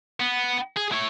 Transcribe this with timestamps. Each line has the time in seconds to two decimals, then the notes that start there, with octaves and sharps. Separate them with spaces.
0.20 B3
0.76 G#4
0.92 E4 C#5